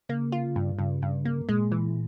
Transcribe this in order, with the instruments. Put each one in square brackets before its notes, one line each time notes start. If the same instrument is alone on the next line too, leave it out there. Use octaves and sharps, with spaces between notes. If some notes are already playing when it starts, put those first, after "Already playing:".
[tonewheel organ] C#3 [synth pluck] A#3
[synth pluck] F4
G2
[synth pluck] G2 [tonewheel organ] C#3
[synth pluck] G2
A#3
[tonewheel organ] A#2 [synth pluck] G#3
[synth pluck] E3